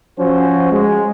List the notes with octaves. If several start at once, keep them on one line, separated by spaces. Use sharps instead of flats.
F3 C#4 F#4 C5
G#3